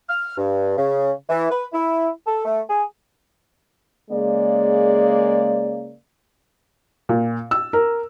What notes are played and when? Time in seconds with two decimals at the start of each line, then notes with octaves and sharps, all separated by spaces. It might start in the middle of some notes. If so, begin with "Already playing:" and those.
0.09 F6
0.37 G2
0.77 C#3
1.29 E3
1.51 B4
1.73 E4
2.26 A4
2.45 A3
2.70 G#4
4.11 C#3 G#3 A#3 D5
7.09 A#2
7.51 E6
7.73 A#4